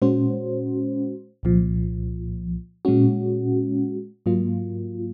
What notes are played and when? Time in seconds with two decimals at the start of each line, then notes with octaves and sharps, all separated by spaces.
0.02 A#2 G#3 C#4 F#4 C5
1.43 C2 A#2 F3
2.85 A#2 G#3 C#4 F#4
4.26 G#2 F#3 A#3 F4